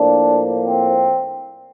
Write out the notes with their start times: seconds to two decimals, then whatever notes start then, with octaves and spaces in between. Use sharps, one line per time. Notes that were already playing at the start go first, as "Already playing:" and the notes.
Already playing: A2 F3 A#3 D4
0.66 C4